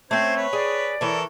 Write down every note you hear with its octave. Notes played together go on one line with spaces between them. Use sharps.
A3 C4 C#4 C5 G#6
B4 C#5
G#4 D5
E3 A4 A#4 C#5